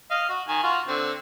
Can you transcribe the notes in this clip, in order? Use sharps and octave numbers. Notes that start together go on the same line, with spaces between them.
D#5 F5
F#4
D#3 G#5
F4 F#4
D3 C4